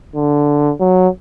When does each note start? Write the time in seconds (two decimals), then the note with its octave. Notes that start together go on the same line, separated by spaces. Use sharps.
0.15 D3
0.80 F#3